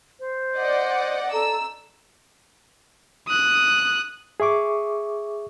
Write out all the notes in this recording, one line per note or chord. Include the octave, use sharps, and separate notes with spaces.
C5
D5 D#5 F#5
A4 A#5 E6
D#6 F#6
G#4 E5 C#6 D6